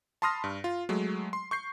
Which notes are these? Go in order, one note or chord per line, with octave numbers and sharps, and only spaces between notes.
A5 B5 C6 D#6 F6 A#6
G2
F4
F#3 G#3 A3
C6
C#6 G6 C7